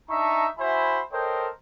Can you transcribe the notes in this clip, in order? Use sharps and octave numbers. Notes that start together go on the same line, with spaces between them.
D4 D#4 E5 A5 A#5 C#6
E4 F#4 C5 E5 G#5 B5
A4 A#4 C5 C#5 D#5 G5